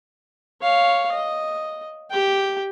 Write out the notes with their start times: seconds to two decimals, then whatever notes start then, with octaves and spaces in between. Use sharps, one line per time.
0.62 C#5 F5
1.12 D#5
2.10 G4 G5